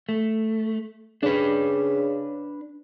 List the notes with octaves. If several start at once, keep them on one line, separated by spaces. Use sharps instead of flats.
A3
C#3 D4 B4